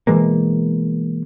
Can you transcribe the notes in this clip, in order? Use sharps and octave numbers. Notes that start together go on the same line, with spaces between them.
B2 E3 G#3 A#3